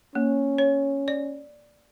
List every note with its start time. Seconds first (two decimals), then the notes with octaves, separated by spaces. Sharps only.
0.15 A#3 C#4
0.58 C#5
1.08 D5